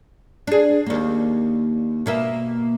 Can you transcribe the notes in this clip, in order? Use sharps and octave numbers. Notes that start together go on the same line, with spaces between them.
D4 G#4
D#2 A#3
B2 A#3 E5